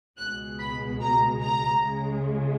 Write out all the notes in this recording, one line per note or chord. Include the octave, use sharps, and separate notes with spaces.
C#2 B2 G#3 F#6
B5
A#5
A#5
C#2 C#3 G#3